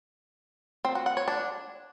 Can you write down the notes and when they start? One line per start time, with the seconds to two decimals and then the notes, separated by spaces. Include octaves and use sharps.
0.85 C4
0.95 F#4
1.06 F#5
1.17 C#5
1.28 D4